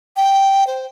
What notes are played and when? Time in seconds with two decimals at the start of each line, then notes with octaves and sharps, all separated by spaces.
0.16 G5
0.67 C5